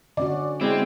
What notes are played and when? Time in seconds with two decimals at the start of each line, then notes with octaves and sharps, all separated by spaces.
0.17 D3 C#4 F#4 D5
0.61 G#3 C4 E4